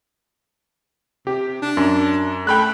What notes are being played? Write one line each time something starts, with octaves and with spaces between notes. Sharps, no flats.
C3 G4
D4
F#2
A3 G5 B5 F#6